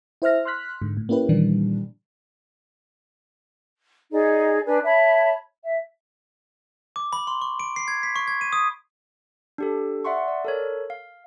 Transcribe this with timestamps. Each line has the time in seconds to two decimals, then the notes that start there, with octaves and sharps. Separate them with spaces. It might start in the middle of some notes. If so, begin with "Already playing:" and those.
0.22 E4 C5 E5 F6 A#6
0.45 C6 F6 F#6 B6
0.82 G#2 D3
0.97 A2
1.09 A#3 C#4 E4 G4 B4
1.29 A#2 D#3 E3 G3 D4
4.11 D#4 G#4 D5
4.65 D4 B4 D5 G#5
4.84 C#5 E5 A5 B5
5.63 E5
6.96 D6
7.13 B5
7.27 C6
7.41 C#6
7.60 D7
7.76 C7
7.88 G#6
8.03 B6
8.16 C#6
8.28 G#6
8.41 D#7
8.53 D#6
9.58 D4 G4 A4
10.04 D5 E5 F#5 C6 C#6
10.28 D5
10.45 A4 A#4 C#5
10.90 F5